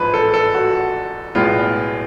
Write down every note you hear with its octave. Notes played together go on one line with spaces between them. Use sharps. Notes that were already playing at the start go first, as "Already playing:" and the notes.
Already playing: A1 G#2 F3 B4
A4
A4
F#4
B1 A2 G#3 B3 F4